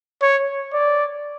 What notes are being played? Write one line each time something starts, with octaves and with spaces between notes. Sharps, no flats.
C#5
D5